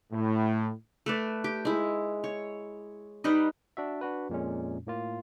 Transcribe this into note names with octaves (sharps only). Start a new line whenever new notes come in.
A2
A3 B4 D5
G4
G#3 E4
C#5
G3 D#4 B4 D#5
D4 F#4 E5
D4 F#4 B4
F2 A#2 G#3 C#4
A2 A#3 F4